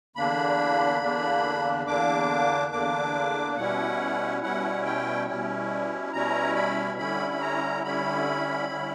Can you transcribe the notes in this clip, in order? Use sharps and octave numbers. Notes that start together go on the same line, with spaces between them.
E2 D3 A#3 D4 B5
E2 D3 A#3 D4
E2 D3 A#3 D4 D6
E2 D3 A#3 D4 D6
B2 G3 C#4 E4 F#5
B2 G3 C#4 E4 F#5
G5
B2 G3 C#4 E4
B2 G3 C#4 E4 A#5
B5
D3 G3 C#4 E4 B5
B5
A#5
D3 G3 C#4 E4 B5
D3 G3 C#4 E4